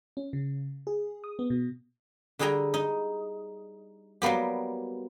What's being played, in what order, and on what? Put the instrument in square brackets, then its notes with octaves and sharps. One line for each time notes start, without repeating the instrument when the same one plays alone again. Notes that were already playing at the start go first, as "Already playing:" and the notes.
[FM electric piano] C#4
C#3
G#4
D#6
B3
B2
[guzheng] D3 G3 G#4 G5 A#5
D#4
F#3 G3 A#3 B3 G4